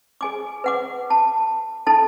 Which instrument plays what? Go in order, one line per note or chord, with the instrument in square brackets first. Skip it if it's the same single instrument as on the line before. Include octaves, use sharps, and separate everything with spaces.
[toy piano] G#4 G#5 D6
B4 F#5 D6
A5
D#4 A4 A5